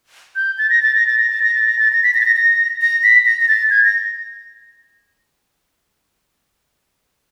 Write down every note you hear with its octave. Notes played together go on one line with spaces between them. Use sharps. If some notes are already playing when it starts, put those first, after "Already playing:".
G6
A6
A#6
A6
A#6
A6
A#6
A6
A#6
A6
A#6
A6
A#6
B6
A#6
A6
A#6
A#6
A#6
B6
A#6
A#6
A6
G#6
A#6